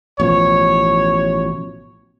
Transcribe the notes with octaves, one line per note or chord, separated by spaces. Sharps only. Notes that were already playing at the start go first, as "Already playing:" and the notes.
A1 B2 F3 C#5